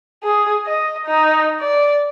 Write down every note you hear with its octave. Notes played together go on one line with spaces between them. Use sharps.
G#4
D#5
D#4
D5